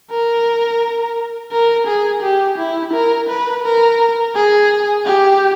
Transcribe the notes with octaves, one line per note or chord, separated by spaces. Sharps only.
A#4
A#4
G#4
G4
E4
A#4
B4
A#4
G#4
G4